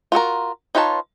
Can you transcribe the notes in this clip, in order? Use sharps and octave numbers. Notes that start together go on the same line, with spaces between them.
F4 F#4 A4 A#4
D#4 F4 B4 C#5 A5